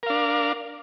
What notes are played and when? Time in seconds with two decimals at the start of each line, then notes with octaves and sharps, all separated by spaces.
0.03 A#4
0.06 F5
0.10 D4